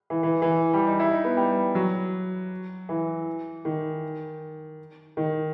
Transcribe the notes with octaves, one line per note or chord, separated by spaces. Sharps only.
E3
E3
E3
G3
D#4
E4
D#4
B3
G3
F#3
E3
D#3
D#3